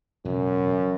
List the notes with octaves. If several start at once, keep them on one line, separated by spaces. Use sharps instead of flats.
E1 F#2 C#3